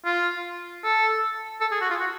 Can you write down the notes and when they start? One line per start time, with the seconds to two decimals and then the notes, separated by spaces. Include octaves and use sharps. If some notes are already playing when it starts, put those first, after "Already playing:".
0.05 F4
0.84 A4
1.61 A4
1.71 G#4
1.81 F#4
1.90 F4
2.00 F#4